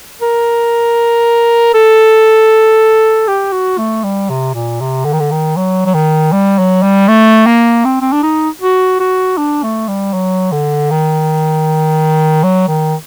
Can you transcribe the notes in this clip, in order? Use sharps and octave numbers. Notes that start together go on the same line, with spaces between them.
A#4
A4
G4
F#4
A3
G3
C3
A#2
C3
D3
D#3
D3
D#3
F#3
F#3
D#3
G3
F#3
G3
A3
A#3
C4
C4
D4
D#4
F#4
F#4
D4
A3
G3
F#3
D3
D#3
F#3
D#3